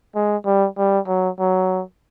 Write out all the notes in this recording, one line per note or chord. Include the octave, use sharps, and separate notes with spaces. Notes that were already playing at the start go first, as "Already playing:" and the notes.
G#3
G3
G3
F#3
F#3